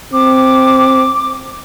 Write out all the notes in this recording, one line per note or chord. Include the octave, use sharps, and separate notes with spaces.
C4 D6